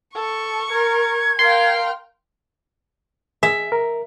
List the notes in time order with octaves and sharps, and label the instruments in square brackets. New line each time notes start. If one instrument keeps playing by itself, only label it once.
[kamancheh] A4 [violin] C#6
[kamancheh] A#4 [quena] G#6
[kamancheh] A#4 F5 [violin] G5 F6 [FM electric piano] C6
[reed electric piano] G#4 [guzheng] E5
[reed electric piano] A#4